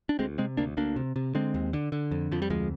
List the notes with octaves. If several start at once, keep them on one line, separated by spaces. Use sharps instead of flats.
D4
D2 G#3 C4
C3 G#3 C4
D2 A#3 D4
D2 A#3 D4
C3
C3
D3 G#3 C4
D#2
D3
D3
F2
F2 F3
G3
D2 F3 G#3